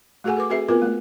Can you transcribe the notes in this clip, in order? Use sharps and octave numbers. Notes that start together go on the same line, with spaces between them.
A3 F#4 G#4 A4 F#5 G#5
A4 B4 D6
C4 F#4 G#4 A4 B4 E5
B3 C4 F4 A#4 B4
A3 A#3